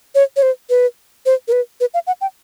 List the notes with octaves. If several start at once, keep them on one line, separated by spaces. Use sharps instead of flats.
C#5
C#5
C5
B4
C5
A#4
B4
B4
F5
F#5
G5